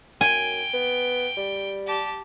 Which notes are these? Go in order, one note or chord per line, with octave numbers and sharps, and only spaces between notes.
F#2 G5 G#5
B3
G3
G4 A5